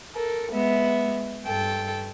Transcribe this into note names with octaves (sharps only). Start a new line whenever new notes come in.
A4 A#4
G#3 B3 E5
G2 A4 G5